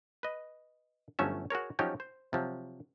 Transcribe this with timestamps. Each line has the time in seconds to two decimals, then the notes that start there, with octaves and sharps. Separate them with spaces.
0.23 B4 D#5
1.19 G1 F3 F#3 A3 C#4 E5
1.50 F#4 G#4 A#4 C#5
1.79 F3 F#3 C#4 D#4 G4 C#5
2.00 C5
2.33 C3 F3 F#3